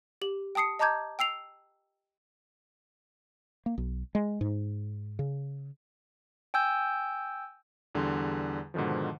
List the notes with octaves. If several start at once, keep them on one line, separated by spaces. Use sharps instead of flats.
G4 F#7
G5 A5 D#6 C7 C#7
D#5 A5 A#5 D6 G6 G#6
G5 E6 C7 F7
A#3
B1
G#3
G#2
C#3
G5 G#5 E6 G6
E2 D3 G3 G#4 C6
G#2 B2 D3 D#3 F3